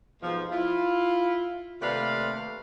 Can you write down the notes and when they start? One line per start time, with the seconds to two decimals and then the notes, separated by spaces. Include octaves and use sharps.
0.22 F2 G#2 B2 F3
0.51 E4 F4
1.82 D#2 C3 A3 B4 D5 F5